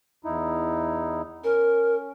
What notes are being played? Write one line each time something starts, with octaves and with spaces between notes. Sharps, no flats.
E2 D#4 E4
C#4 A#4